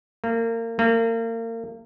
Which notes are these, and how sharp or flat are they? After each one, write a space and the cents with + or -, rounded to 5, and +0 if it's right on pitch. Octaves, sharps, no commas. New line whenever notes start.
A#3 -30
A#3 -35